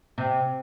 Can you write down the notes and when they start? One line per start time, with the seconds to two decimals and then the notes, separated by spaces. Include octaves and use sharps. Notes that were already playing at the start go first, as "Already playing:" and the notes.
0.18 C3